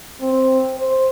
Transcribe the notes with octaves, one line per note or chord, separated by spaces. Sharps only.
C4
C5